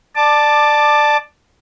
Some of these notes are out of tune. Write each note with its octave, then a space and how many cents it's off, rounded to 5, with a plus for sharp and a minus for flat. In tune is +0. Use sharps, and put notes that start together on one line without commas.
D5 +20 A5 +0 D6 +15